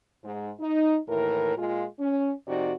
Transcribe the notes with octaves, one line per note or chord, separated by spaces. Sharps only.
G#2
D#4
D#2 A2 E3 A#4
A#2 G#3 F4
C#4
F2 C3 D#4 F#4 D5